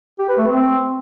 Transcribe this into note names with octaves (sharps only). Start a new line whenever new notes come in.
G4
B4
A3
C4